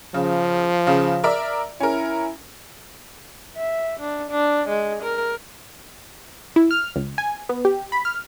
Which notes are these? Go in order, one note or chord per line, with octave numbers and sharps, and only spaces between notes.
C#3 F3
C#3
A#4 D5 E5
C#4 E4 A#4
E5
D4
D4
G#3
A#4
E4
F6
C#2
G#5
B3
G4
B5
F6